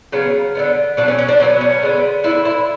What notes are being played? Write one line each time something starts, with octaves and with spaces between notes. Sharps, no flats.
C#3 F#3 B3
D3 G#3 B3
B2 F#3 A3 D4
C#4
C#4
D4
B2 F#3 B3 C#4
C#4
D3 G#3 B3
D3 A3 E4
E4